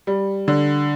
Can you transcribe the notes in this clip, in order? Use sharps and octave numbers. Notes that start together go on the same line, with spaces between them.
G3
D3